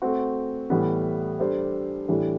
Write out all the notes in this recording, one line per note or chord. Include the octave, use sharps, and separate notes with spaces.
A3 C4 F#4
A2 E3 G3 B3
G3 D4 A4 C5
A2 E3 G3 D4